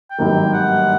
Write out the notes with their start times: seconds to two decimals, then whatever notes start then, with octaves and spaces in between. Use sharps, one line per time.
0.10 G5
0.18 G#1 G2 D#3 F#3 A#3
0.53 F#5